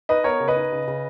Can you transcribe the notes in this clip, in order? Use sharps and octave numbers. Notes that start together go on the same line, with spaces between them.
D#4 B4 D#5
B3 A#4 C#5
C#3
B4 D#5
D#4
C#3
C#3